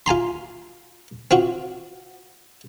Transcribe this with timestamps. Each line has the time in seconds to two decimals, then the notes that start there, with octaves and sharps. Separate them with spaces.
0.06 F4 G#5 A#5 C6
1.31 C4 F4 F#4